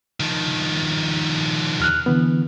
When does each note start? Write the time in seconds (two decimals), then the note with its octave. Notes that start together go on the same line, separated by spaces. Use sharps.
0.20 D#3 F3
1.79 D#2 F6 F#6
2.06 D3 E3 B3